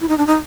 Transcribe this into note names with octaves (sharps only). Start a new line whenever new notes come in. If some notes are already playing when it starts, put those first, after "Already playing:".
E4
D#4
D4
D#4